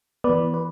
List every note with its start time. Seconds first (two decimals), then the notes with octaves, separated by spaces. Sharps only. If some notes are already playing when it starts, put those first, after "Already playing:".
0.24 B3 B4 D5
0.29 E3
0.54 B4